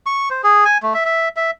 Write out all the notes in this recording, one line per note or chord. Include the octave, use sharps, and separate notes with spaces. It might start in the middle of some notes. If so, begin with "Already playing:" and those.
C#6
C5
G#4
G#5
A3
E5
E5
E5